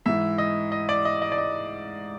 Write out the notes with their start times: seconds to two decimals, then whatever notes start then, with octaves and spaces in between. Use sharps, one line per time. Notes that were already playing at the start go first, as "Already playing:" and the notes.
0.06 G#2 E3 E5
0.38 D#5
0.72 D#5
0.89 D5
1.05 D#5
1.22 D#5
1.32 D5
1.38 D#5